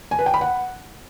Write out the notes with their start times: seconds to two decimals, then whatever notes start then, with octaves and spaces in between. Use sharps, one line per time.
0.11 G#5
0.19 B4
0.26 G5
0.34 B5
0.41 F#5